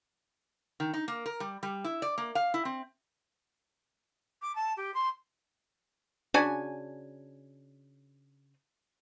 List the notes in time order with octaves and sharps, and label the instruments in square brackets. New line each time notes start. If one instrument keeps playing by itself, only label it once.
[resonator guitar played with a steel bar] D#3
D#4
A#3
A#4
G3
G3
E4
D5
A#3
F5
E4
C4
[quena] D6
A5
G4
C6
[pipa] C#3 D4 F#4 G#5